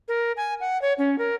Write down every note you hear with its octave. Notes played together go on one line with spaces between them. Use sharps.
A#4
G#5
F#5
C#5
C#4
A#4